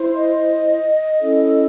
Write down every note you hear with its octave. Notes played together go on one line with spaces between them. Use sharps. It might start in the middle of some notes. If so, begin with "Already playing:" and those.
Already playing: E4 C5
D#5
C#4 E4 A4